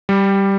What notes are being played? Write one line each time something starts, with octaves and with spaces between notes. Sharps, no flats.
G3